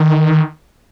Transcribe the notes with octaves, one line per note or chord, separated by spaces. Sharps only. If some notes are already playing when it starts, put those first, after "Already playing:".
Already playing: D#3